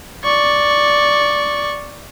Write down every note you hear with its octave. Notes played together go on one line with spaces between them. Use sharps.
D5 C#6